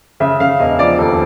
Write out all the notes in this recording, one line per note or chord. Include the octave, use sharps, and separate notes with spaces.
C#3 E5
C#3 F5
E1 D#5
F3 D5
D#2 A4